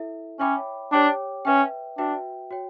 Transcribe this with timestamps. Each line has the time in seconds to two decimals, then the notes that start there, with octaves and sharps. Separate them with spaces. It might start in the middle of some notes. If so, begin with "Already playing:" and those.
Already playing: E4 A4 E5
0.39 C#4 C#5 E5 G5 B5 D6
0.92 D4 G4 C#5 G5 D6
1.45 C#4 B4 E5 G5
1.98 D4 F#4 B4 E5 G5
2.51 F#4 C#5 G5